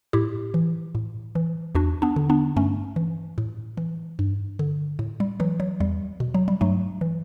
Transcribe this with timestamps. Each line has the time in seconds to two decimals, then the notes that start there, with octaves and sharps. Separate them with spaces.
0.13 A2 E4 G4
0.54 E3
0.95 A2
1.35 E3
1.75 E2 D4 F#4
2.02 B3 D4
2.16 D3
2.30 B3 D4
2.56 G2 A3 C#4
2.96 E3
3.38 A2
3.77 E3
4.19 G2
4.59 D3
4.99 A2
5.20 G3
5.40 E3 F#3
5.60 F#3
5.80 E2 G3
6.20 B2
6.34 F#3
6.48 G3
6.61 G2 F#3 A3
7.01 E3